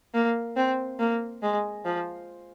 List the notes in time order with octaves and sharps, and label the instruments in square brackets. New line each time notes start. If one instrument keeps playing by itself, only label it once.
[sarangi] A#3
C4
A#3
G#3
F3